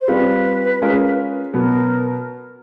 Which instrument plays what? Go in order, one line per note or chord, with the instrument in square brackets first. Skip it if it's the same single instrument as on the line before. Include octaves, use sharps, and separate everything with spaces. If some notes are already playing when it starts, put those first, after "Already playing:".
[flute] C5
[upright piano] G3 C4 F4 [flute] B4
[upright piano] G#3 C#4 F4 A#4
[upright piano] B2 F#3 B3 [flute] A#4